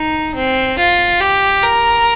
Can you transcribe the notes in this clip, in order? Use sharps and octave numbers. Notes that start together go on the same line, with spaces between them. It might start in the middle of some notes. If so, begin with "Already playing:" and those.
Already playing: D#4
C4
F4
G4
A#4